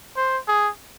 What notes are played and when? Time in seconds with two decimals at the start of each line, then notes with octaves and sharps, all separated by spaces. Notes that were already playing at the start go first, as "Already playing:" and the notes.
0.17 C5
0.48 G#4